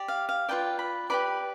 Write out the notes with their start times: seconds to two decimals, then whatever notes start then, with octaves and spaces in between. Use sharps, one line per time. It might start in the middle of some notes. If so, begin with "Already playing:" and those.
Already playing: G4 D5
0.08 F5
0.29 F5
0.49 F4 B4 D5 G5
0.79 B5
1.10 G4 B4 D5 B5